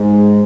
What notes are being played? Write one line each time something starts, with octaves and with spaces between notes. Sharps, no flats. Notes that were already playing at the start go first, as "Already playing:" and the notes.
Already playing: G#2 G#3